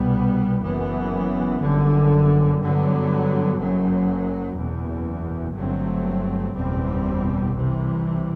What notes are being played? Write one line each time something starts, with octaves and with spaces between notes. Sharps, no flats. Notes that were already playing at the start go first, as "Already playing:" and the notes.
Already playing: C2 B2 G3 B3
F#1 F#2 E3 B3
G1 F#2 D3
G2 D3 F#3 B3
F#1 F#2 F#3
F#1 E2 B2
G1 G2 F#3 A3 C4
F#1 E2 B2 G3 C4
C2 C3 E3